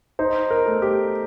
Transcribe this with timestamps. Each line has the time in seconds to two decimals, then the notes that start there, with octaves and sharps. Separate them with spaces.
0.19 D#4 C5
0.51 A#4
0.66 A3
0.82 G4